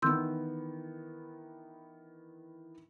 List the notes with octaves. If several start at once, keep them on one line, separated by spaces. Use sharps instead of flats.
D#3 E3 B3 C6 E6 G6